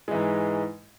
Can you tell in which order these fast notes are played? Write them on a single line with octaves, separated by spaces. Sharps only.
G#3 E3 G#2